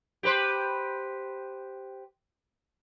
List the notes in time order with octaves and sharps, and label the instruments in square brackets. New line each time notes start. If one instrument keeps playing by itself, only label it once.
[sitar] G4 B4 C5